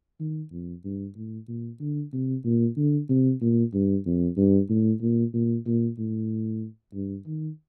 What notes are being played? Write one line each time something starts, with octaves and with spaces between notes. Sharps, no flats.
D#3
F2
G2
A2
A#2
D3
C3
A#2
D3
C3
A#2
G2
F2
G2
A2
A#2
A#2
A#2
A2
G2
D#3